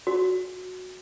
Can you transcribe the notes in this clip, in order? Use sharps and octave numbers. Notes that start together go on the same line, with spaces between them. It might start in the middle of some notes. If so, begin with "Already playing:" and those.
F#4